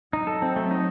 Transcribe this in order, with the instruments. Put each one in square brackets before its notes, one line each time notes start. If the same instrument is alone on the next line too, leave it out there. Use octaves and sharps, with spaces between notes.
[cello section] F#3 [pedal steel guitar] D#4
[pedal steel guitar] A4
C4
A3
D#4